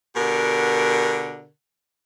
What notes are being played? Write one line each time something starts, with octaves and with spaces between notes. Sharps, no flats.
B2 D3 G4 A#4